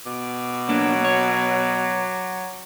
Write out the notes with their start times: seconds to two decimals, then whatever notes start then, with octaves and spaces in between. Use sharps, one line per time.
0.06 B2 D6
0.69 F#3 A#3 D4
1.05 C#5